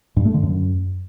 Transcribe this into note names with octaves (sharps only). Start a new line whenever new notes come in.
G2
A3
D3
F#2